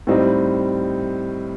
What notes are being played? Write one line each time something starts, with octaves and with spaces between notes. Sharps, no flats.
A2 G3 C4 D#4